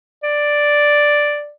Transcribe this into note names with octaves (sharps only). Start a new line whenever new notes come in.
D5